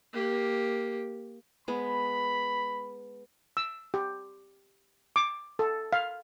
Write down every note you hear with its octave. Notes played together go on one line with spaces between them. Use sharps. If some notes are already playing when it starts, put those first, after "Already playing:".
A#3 G4
G#3 B3 B5
E6
G4
D6
A4
F5